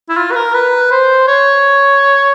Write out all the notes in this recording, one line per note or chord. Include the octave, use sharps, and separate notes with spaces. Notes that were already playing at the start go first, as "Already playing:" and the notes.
E4
F4
B4
A#4
B4
C5
C#5